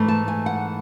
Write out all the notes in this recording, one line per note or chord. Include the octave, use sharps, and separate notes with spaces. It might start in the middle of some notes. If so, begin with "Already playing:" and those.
Already playing: G#2 E3 A3
A5
G#5
F#5